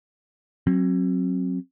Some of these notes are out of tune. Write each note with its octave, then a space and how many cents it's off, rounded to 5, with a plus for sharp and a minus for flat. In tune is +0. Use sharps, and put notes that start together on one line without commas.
F#3 +0 C4 +35